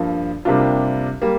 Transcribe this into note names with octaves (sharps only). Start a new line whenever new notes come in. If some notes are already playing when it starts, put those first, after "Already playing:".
Already playing: G2 F3 A#3
C3 G3 A#3 D4 F4
G3 A#3